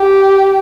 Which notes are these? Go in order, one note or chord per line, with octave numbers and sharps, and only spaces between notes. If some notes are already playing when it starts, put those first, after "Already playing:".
Already playing: G4